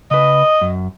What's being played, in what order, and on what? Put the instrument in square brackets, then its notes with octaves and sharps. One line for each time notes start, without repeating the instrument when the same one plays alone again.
[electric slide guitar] C#3 B4 [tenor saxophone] D#5
[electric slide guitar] F#2